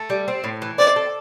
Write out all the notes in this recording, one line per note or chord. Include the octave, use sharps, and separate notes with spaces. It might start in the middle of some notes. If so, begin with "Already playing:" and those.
Already playing: A3
G3
C4
A2
E3
C4 D5
A4